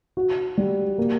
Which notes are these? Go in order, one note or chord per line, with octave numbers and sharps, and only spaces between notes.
F#4
G3
A#3